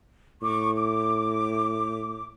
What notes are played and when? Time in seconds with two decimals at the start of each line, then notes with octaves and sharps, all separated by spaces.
0.42 A2 C#6 D6
0.75 D6